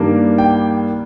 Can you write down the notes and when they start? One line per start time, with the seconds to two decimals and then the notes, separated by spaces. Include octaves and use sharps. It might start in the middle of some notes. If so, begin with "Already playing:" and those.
Already playing: G2 D#3 G3 A#3 D4
0.38 G5